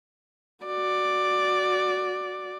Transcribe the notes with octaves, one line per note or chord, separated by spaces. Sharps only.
F#4 D5